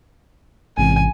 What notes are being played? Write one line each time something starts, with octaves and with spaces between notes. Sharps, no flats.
A1 G#2 C3 E3 G#5